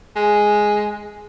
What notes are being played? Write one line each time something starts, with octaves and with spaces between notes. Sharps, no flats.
G#3